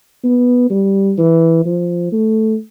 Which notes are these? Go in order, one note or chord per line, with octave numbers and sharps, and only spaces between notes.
B3
G3
E3
F3
A3